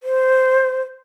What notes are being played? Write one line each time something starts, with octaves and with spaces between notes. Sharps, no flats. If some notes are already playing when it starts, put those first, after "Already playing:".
C5